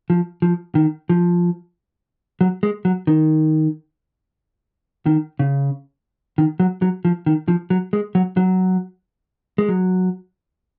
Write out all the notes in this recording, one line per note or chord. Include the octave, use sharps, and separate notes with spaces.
F3
F3
D#3
F3
F#3
G#3
F#3
D#3
D#3
C#3
D#3
F#3
F#3
F3
D#3
F3
F#3
G#3
F#3
F#3
G#3
F#3